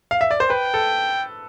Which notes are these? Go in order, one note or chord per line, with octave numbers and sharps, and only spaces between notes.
F5
E5
D5
C5
B4 G5
A4